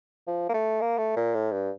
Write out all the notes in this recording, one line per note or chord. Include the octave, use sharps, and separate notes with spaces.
F3
A#3
A3
A#3
A3
A#2
A2
G2